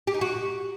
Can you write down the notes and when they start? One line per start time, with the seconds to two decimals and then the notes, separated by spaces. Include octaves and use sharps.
0.07 G4
0.14 D#4
0.21 F#4